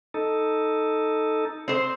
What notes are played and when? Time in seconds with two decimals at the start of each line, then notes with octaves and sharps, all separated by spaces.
0.14 D#4 A4
1.68 C4 C5